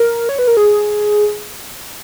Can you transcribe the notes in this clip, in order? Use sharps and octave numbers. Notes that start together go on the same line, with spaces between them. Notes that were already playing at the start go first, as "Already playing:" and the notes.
Already playing: A#4
C#5
B4
A#4
G#4